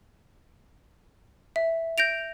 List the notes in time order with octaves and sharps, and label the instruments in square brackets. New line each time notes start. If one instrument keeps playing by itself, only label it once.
[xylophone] E5
G6 A#6 D7 F7